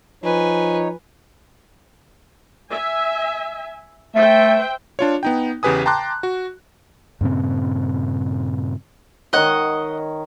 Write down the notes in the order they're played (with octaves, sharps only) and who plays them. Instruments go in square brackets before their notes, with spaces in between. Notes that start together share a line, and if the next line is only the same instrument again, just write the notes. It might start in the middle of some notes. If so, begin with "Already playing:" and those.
[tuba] F3 [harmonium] D#4 C#5 [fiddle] B4 G#5
[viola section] E5 G#5
[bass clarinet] A3 [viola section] C5 E5 G5
[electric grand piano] D4 F4 C#5
B3 D#4 G5
E2 C#3 G4 B4 G#5 D#6
G5 A5 A#5 C6 D6 F#6
F#4
[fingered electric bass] G2 A#2 C#3 C4
[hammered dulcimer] D#3 C#5 [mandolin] D#5 F#5